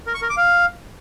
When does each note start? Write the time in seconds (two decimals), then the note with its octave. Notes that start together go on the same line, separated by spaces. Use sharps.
0.07 A#4
0.14 C#6
0.22 A#4
0.29 D6
0.37 F5